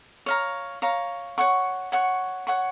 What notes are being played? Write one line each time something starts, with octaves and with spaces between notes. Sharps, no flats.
C#5 F5 A#5
C#5 F5 A#5
C#5 F#5 C#6
C#5 F#5 C#6
C#5 F#5 C#6